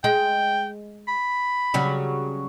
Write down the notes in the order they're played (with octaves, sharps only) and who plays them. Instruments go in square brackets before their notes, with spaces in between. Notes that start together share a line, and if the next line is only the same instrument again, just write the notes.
[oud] G#3 [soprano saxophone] G5
[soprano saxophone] B5
[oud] C#3 F#3 G3